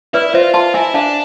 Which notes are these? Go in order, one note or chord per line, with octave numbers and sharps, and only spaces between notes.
E4 B4 D5
F4 C5 E5
F4 A5 C6
E4 E5 G#5
D4 F5 A5